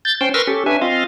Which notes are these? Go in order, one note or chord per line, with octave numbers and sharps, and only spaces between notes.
G6 A6
C#4 C5 G5
A#4 B4 C6 C#6 E6 F6
C#4 G4 A4
C#4 D4 B4 E5 G#5
C4 F4 D#5 F5